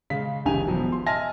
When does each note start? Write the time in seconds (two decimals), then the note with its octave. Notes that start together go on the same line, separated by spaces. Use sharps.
0.10 C#3 G#3 F5 B6
0.45 F1 C2 D#3 G#5 F7
0.67 E1 E2 F3 F#3
0.92 C6
1.06 D#5 E5 G#5 A5 F6 A#6